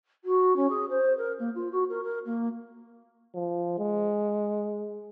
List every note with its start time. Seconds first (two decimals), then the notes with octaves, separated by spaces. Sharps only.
0.24 F#4
0.56 C#4
0.70 G#4
0.90 C5
1.18 A#4
1.39 A#3
1.55 F4
1.72 F#4
1.89 A#4
2.04 A#4
2.25 A#3
3.35 F3
3.79 G#3